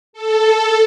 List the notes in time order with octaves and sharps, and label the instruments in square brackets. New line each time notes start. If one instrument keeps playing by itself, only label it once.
[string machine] A4